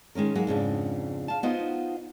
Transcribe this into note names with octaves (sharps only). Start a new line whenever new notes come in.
D#3 G#3 C#4 A#4
F#3 G#3 A#3 G#4 F#5
F2 G#2 C#3 D4
F5 A5
B3 D#4 F4 F#4 C5 D#5